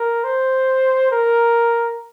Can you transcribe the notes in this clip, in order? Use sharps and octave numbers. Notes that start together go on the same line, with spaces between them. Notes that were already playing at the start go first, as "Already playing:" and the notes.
Already playing: A#4
C5
A#4